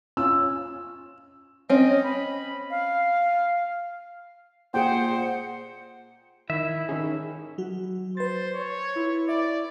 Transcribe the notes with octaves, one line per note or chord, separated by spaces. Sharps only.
C#4 F4 E6
C4 C#4 C#5 D#5
B5
F5
A#2 G#4 C5 F#5 G5
D#3 E4 E5
D#3 C#4 D#4 G#4
F#3 F#4
B4 C5 A6
C#5
E4
D5 E5 B5